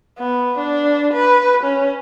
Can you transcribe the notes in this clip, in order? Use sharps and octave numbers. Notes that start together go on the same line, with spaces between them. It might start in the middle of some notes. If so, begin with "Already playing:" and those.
B3
D4
B4
C#4